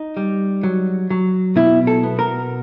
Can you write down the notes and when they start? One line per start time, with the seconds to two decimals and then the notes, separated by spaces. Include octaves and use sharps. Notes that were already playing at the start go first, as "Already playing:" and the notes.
Already playing: D#4
0.17 G3
0.63 F#3
1.10 F#3
1.56 B2 E4
1.87 A4
2.03 B3
2.19 A#4